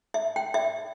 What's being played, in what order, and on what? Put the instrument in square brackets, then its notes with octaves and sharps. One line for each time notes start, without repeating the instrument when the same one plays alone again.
[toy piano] E5
G5
E5